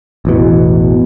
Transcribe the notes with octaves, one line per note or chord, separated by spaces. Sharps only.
A1 E2 B2